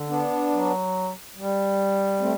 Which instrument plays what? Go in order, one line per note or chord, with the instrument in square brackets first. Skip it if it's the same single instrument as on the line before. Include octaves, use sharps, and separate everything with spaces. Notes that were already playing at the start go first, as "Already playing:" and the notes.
Already playing: [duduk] D3
[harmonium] B3 D4
[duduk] F#3
G3
[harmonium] A3 C4